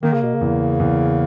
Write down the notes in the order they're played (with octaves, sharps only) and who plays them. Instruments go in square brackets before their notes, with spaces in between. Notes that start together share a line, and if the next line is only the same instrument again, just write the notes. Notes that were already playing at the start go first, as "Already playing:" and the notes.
[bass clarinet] D#3 [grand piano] A#3
[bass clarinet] C#3
B2
C#3
[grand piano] E2
E2